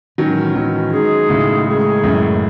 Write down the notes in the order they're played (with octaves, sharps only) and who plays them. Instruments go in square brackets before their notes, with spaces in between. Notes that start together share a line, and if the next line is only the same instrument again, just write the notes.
[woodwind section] A2 E3 G#3 C#4 F#4 [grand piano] D#3 F#3
[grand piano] D#3 F#3
[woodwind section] G#3 D#4 G#4
[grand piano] A2 C#3
[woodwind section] D#3 G#3 C#4 G#4
[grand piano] F#2 A2